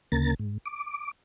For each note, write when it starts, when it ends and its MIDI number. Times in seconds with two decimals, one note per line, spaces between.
0.12 0.34 38
0.12 0.34 49
0.12 0.34 58
0.12 0.34 82
0.12 0.34 93
0.39 0.58 44
0.66 1.11 86